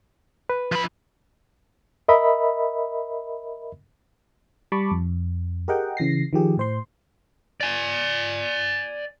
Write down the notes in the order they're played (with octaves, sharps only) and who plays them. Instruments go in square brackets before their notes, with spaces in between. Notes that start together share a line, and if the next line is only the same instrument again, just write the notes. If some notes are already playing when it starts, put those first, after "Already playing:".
[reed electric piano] B4
[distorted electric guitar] F3 B5
[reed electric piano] A#4 D#5 E5 B5
[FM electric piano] G3 A5 B5 C#6 D6
F2
G4 G#4 A#4 D#5 F#5 G5
C#3 E3 A#6 C7
D#3 F3 G4 G#4
A2 C5 C6
[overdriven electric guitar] D5 G#5